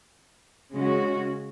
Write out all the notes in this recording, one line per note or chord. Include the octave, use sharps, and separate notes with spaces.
C#3 G#3 C#4 F#4